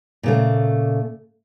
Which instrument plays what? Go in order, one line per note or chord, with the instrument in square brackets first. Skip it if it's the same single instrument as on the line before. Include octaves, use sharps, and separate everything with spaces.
[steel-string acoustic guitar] A#2 C#3 A3